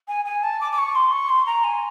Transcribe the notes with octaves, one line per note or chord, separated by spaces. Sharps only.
G#5
G#5
A5
D6
D6
C#6
C6
C#6
C6
A#5
G#5